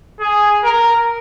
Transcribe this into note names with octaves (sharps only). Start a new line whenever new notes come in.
G#4
A#4